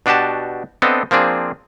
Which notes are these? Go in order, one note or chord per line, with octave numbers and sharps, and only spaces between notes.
B2 D4 F#4 G4 A5
B3 C4 D4 A4 D#5 F5
F3 A#3 C4 D4 G#4